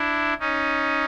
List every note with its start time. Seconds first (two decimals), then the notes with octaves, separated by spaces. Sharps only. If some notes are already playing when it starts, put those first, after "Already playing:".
Already playing: D4 E4
0.40 C#4 D#4